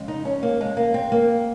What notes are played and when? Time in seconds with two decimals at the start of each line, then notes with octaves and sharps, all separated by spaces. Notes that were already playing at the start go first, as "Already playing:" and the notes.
Already playing: F2 C#3 G#3
0.08 D#4
0.25 C#4
0.43 A#3
0.61 G#3
0.77 A#3
0.94 C4
1.12 A#3